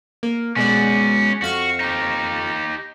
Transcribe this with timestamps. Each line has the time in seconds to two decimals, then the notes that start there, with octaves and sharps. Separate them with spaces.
0.23 A#3
0.56 B2 G#3 C#4 F#4 D5
1.42 F2 F#4 F5 C#6
1.80 D#4 G4